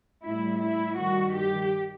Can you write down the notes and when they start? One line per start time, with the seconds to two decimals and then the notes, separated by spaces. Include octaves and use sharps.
0.24 A2 G3 E4
0.62 E4
0.97 G2 D#3 G3 F#4
1.35 G4